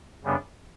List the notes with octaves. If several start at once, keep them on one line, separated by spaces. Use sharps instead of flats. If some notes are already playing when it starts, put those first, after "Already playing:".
F#2 C#3 G3 B3 D4